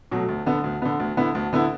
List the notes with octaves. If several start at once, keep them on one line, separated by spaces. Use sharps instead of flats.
B2 F#3 A3
D2
D3 B3
D2
D3 B3
D2
D3 B3 E4
D2
D3 B3 E4